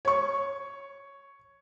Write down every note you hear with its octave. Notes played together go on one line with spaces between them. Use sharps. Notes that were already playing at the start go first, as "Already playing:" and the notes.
C#5 C#6